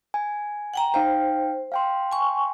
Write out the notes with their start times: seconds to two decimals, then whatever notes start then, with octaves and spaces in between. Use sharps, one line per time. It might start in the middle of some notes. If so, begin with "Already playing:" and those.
0.14 G#5
0.74 F#5 G5 A#5
0.94 D#4 C5 F5 G5
1.72 F5 G5 C6
2.12 G#5 C#6